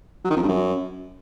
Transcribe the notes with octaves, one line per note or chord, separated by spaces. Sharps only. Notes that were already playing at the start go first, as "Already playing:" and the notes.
F#3
D#3
F2
G2
F#2